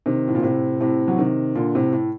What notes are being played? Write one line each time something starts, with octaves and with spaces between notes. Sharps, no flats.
C3 D#3
A2
A#2
A2 C3
A2 C3
F#3
C3 D#3
A#2 D3
A2 C3
A2